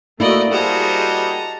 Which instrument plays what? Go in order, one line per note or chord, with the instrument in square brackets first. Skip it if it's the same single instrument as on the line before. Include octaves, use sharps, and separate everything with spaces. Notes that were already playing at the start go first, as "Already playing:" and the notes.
[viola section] A3 D#4 F#4 [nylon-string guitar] A#3 E4 [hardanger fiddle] D5 D#5
[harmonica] G3 F#4 [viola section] G#4 C5 D#5 [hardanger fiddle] A5 A#5